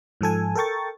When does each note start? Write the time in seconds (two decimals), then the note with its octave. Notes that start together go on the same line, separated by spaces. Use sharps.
0.21 G#2 F3 A4 G#5
0.55 A4 A#4 G5 C#6 A6